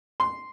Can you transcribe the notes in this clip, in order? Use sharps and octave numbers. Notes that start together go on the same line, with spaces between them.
C6